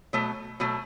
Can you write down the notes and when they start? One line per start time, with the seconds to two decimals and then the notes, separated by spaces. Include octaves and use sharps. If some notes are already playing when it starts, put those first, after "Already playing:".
0.13 B2 F#3 A3
0.60 B2 F#3 A3